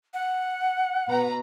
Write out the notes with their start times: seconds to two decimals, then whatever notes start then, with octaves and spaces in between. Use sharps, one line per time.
0.14 F#5
1.08 B2 B4 A#5